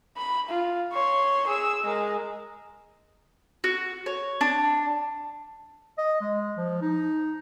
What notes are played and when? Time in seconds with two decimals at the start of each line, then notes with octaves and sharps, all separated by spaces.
0.17 B5
0.49 F4
0.93 C#5 C6
1.47 G#4 E6
1.84 G#3 A#4
3.64 F#4
4.06 C#5
4.41 D4
5.99 D#5
6.21 G#3
6.57 F3
6.82 D#4